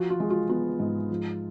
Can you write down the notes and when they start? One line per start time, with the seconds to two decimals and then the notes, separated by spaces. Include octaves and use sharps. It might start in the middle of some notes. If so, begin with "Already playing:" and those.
Already playing: F3 F#4
0.10 F4
0.20 G#3
0.30 F4
0.49 B3 F4
0.79 G#2
1.10 F3